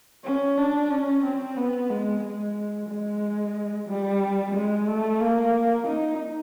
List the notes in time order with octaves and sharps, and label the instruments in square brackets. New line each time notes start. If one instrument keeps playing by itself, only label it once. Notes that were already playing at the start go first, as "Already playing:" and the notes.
[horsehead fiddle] C#4
D4
C#4
C4
B3
G#3
G#3
G#3
G3
G#3
A3
A#3
D#4